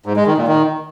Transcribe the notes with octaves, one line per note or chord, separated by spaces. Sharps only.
G#2
G#3
D#3
A#2
D#3